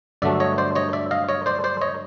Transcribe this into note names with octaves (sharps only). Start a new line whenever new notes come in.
G2 D3 F#3 A3 D4 D5 E5
C#5 D#5
C5 D5
C#5 D#5
D5 E5
D#5 F5
C#5 D#5
C5 D5
C5 D5
C#5 D#5